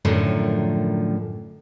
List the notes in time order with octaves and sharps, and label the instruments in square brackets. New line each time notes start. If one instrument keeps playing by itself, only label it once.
[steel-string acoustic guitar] F#2 A2 D3 D#3 F3